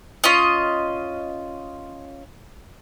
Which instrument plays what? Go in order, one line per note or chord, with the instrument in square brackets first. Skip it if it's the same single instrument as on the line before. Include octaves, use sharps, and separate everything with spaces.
[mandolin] C#4 F4 D#5